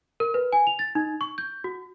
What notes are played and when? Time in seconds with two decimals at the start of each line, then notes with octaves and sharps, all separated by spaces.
0.20 A#4
0.34 B4
0.53 G#5
0.67 F7
0.79 A6
0.95 D#4
1.21 C#6
1.38 G6
1.64 F#4